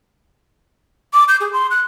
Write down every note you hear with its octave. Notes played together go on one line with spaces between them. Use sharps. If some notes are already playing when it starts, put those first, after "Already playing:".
D6
G6
G#4
C6
F#6